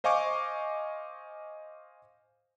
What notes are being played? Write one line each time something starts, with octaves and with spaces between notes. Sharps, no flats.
C5 D#5 F5 G#5 C#6 D6